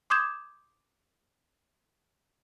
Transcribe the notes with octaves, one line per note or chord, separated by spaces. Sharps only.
C6 D6 D#6 G6 G#6 E7